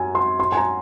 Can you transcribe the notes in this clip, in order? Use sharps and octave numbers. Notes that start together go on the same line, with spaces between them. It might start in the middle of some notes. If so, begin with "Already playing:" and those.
Already playing: F#2 G#5
C6
C6
G#5
A#5